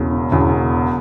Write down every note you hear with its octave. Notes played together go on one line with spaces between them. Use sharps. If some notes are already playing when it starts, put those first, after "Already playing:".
Already playing: E1 E2 C#3
E1 E2 C#3